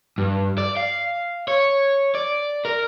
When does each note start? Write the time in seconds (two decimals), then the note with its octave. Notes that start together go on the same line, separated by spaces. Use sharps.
0.18 G2
0.58 D5
0.77 F5
1.48 C#5
2.15 D5
2.65 A#4